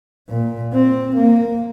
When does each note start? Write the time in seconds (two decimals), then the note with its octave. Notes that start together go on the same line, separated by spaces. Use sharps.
0.29 A#2
0.73 C4
1.16 A#3